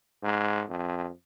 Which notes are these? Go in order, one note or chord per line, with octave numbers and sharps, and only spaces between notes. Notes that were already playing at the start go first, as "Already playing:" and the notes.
G#2
F2